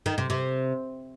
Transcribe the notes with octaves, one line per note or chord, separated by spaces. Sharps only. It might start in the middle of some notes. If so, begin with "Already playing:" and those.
D#3
C3
C3